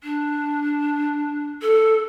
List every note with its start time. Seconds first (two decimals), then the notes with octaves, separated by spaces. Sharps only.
0.03 D4
1.62 A4